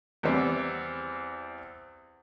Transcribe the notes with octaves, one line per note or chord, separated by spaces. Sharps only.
E2 G3 B3 C4